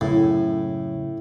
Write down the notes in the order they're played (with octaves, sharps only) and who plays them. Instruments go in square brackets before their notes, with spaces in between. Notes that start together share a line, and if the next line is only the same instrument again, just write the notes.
[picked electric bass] F#2 C#3 [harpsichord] A2